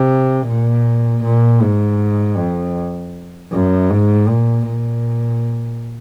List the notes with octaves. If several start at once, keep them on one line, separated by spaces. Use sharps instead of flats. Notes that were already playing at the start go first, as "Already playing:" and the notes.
Already playing: C3
A#2
A#2
G#2
F2
F#2
G#2
A#2
A#2